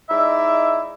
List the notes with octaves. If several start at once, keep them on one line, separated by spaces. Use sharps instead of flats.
G#3 D#4 E4 D5 E5